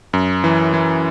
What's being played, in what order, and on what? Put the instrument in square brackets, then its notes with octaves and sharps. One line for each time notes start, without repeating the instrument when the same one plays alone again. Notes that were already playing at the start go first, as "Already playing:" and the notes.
[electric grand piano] F#2
E3
E3